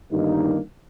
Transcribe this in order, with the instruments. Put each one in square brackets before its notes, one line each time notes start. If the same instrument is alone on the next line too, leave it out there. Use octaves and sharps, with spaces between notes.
[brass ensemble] G1 G2 D#3 A#3 D#4